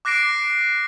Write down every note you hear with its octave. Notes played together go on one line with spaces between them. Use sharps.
D6 F#6 A#6 C7 D7